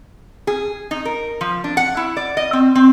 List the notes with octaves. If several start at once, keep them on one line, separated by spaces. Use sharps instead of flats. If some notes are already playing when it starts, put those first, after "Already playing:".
G#4
D#4
A#4
F3
D4
F#5
E4
D5
D#5
C4
C4